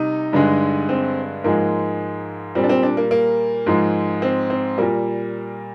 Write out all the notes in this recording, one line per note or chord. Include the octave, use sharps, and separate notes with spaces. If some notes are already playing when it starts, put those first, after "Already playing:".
Already playing: C3 G3 D#4
G2 D3 G#3
C4
G#2 F3 G#3 A#3
A#2 G3 C4
D4
C4
D4
A#3
A#3
G#2 F3 G#3
C4
C4
A#2 G3 A#3